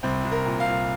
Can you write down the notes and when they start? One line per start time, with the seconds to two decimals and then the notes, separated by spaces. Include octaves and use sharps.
0.03 C2 C4
0.24 C2
0.31 A#4
0.45 A#2
0.60 F5
0.66 C2